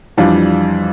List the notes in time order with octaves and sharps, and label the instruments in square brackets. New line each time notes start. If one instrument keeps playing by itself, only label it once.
[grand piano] F2 E3 G3 D4 F4